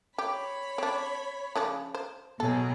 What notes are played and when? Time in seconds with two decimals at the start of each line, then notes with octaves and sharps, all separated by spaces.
0.18 G4 C#5 B5
0.78 C4 D4
1.56 C#3 F3 D4
1.95 C5
2.40 B2 F#3 G#4 A4